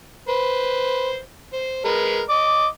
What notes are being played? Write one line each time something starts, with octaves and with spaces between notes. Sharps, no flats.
B4 C5
C5
G#3 A#4 B4
D#5 D6